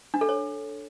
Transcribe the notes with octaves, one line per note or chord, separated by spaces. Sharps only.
D4
A4
C#5